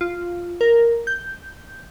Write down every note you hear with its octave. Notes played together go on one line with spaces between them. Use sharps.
F4
A#4
G6